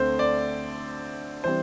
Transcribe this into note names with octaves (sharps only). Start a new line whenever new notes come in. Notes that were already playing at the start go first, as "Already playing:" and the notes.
Already playing: D2 D3 A3 C4 C5
D5
E3 G3 C4 C5